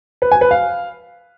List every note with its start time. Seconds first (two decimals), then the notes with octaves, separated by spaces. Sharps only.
0.22 B4
0.32 G#5
0.41 B4
0.51 F5